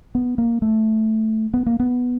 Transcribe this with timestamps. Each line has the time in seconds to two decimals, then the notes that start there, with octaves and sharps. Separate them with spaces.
0.15 B3
0.38 A#3
0.62 A3
1.54 B3
1.66 A#3
1.80 B3